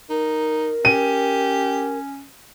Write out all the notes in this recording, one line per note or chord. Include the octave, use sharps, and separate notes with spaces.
D#4 A#4
C#4 G4 D#7